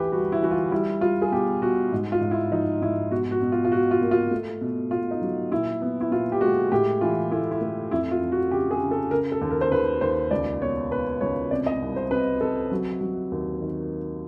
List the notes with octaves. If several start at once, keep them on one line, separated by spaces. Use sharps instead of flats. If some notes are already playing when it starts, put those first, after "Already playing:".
Already playing: D2 E3 G4 B4
G3 F#4
E4
E3 F#4
F4
G3 E4
G3 F4
G#4
B2 G4
B2 F#4
G#2
F4
G#2
E4
F3 D#4
G#2 E4
B2 F#4
F#4
B2
F4
F4
B2 F#4
F4
A#3
F4
A3
B2
B2 F4
D#4
F#3
A#2 E4
B3
E4
A#2 F4
G4
G#3 F#4
A2 G4
E3 F4
A3 E4
E4
A3
F2 E4
F4
F2
F#4
C#3 G4
G#4
C#3
A4
C#3 A#4
A4
D#2
A#4
C5
D#2 B4
D#2 C5
C#2 D5
B2 C#5
B2 B4
C#2 C#5
C3 D5
D#5
C2
C5
C3 B4
C3 A4
F#3
F#3
D#2
D#3